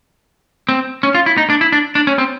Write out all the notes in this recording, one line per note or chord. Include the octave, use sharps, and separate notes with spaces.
C4
C#4
F4
E4
D#4
D4
E4
D4
D4
C#4
C4